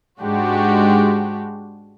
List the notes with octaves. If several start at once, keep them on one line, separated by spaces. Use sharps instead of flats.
G#2 G#3 D4 F#4 G4